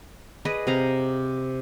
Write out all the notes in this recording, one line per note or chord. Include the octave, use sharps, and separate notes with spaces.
G#4 B4 D5 D#5
C3 F5 A#5